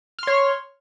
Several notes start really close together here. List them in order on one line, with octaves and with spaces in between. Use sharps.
F6 C6 C#5